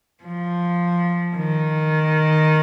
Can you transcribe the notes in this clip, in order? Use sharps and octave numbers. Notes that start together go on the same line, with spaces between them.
F3
D#3